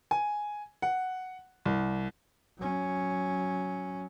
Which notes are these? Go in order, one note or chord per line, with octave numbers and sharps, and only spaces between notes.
G#5
F#5
C2
F#3 C#4